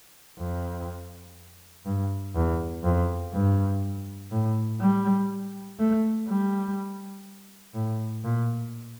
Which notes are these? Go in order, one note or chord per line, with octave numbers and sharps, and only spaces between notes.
F2
G2
E2
F2
G2
A2
G3
A3
G3
A2
A#2